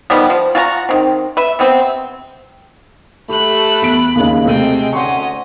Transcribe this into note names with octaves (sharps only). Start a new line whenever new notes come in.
D#3 F3 G3 B3
F3
F4 F#4 A5 A#5
D#3 C4
B4 E5
C3 B3 C4
A3 G4 B5 F#6
E2 B6 D7
D#2 C#3 G#3
C3 A3 C4 G5 D#7
D2 C#4 D#5 F#5 C6 C#6